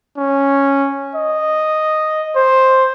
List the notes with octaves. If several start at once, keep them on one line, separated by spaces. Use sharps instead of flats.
C#4
D#5
C5